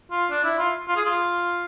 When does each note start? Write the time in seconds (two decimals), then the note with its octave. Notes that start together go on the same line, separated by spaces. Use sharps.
0.11 F4
0.31 D4
0.44 E4
0.58 F4
0.88 F4
0.96 G#4
1.05 F4